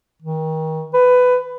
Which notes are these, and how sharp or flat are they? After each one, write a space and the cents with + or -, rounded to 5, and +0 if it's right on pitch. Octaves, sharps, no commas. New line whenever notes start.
D#3 +30
B4 +15